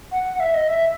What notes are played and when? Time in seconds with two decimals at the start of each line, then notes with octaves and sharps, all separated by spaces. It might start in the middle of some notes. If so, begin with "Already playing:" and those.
0.12 F#5
0.40 E5
0.54 D#5
0.68 E5